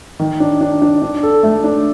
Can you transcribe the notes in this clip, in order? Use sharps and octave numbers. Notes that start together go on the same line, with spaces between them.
D#3
D4
D4
D4
D4
A4
A3
D4